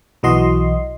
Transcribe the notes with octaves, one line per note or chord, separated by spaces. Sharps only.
B1 E3 F#4 D#5 C6